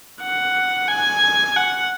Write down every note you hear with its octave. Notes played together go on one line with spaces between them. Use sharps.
F#5
G#5
F#5